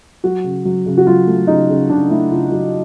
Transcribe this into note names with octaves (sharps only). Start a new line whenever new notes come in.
F#3 F#4
C#3
F#3
C#3
F#4
F#3 F4
A3
C#3 D#4
C#3
C#3 D4
A3 E4
C#3 F4
F#3 F#4